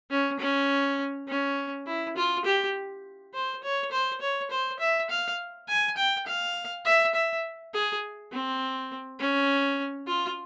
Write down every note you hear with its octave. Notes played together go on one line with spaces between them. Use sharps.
C#4
C#4
C#4
E4
F4
G4
C5
C#5
C5
C#5
C5
E5
F5
G#5
G5
F5
E5
E5
G#4
C4
C#4
F4